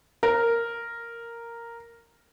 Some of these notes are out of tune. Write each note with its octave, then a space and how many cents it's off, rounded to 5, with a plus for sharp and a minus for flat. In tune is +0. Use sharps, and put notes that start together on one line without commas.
A#4 -5